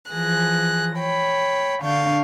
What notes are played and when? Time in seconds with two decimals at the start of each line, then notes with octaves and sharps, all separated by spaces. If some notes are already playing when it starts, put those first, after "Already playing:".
0.12 E3 F3 G#4 F#6 A#6
0.96 C#5 G5 B5
1.82 D3 D4 F5 C#6 G6 A6